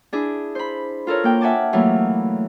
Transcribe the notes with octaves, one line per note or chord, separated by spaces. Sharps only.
D4 E4 G#4
C5 B5
F4 A4 A#4 C#5
A#3 G5
E5 F#5 G#5 A5 D6
E3 F#3 A3 A#3